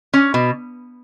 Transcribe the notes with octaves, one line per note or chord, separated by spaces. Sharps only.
C#4
B2